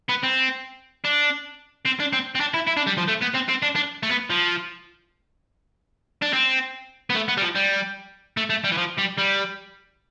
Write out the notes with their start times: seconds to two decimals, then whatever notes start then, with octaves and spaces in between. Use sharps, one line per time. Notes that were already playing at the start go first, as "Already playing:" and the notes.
0.09 B3
0.24 C4
1.05 D4
1.86 C4
2.00 D4
2.13 C4
2.35 C4
2.40 D4
2.54 E4
2.67 E4
2.77 D4
2.87 G3
2.98 F3
3.08 A3
3.22 B3
3.35 C4
3.49 C4
3.62 D4
3.75 D4
4.03 A3
4.10 B3
4.30 F3
6.22 D4
6.33 C4
7.10 B3
7.15 A3
7.28 B3
7.38 G3
7.42 F3
7.55 G3
8.37 A3
8.50 A3
8.64 G3
8.72 E3
8.78 F3
8.98 G3
9.18 G3